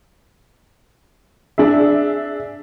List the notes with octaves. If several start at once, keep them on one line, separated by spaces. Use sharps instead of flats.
D4 G#4 E5